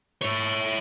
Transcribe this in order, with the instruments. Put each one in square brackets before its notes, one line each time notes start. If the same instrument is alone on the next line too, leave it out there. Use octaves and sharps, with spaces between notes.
[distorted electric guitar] E4 C#5